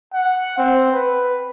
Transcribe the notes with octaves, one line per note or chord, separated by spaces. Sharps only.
F#5
C4
B4